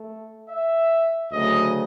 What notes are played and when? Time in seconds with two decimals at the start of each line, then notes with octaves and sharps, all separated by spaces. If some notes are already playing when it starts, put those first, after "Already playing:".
Already playing: A3
0.49 E5
1.32 D2 C#3 F#3 A3 D#5